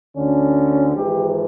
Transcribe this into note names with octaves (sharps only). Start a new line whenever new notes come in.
D2 D3 C#4
G#1 G#2 E3 G4